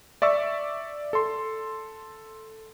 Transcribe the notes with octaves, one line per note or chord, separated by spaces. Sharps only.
D5 E5 C#6 E6
A4 C6